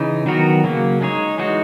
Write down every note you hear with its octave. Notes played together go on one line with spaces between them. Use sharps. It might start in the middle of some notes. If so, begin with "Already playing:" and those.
Already playing: C#3 E3 D#4
D#3 F#3 B3 F#4 A#4
C#3 F#3 A#3 C#4
G#3 D#4 G#4 C#5
E3 G#3 D#4 F#4